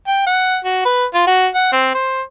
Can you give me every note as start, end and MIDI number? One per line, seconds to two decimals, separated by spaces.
0.08 0.26 79
0.27 0.58 78
0.65 0.85 66
0.85 1.05 71
1.15 1.24 65
1.27 1.47 66
1.55 1.72 78
1.73 1.90 60
1.95 2.22 72